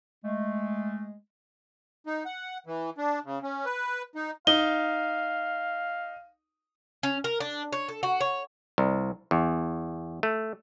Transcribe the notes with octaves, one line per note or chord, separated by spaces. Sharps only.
G#3 A3
D#4
F#5
E3
D4
C#3
C#4
B4
D#4
D#4 F5 G7
C#4
A#4
D4
C#5
A4
F#4
C#5
C2
E2
A3